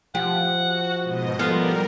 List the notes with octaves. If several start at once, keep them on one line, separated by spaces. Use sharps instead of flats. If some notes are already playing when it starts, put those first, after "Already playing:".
F3 G4 F#5
F#4
G#2 B2 D#5
F3 G3 B3 F4 A4 A#4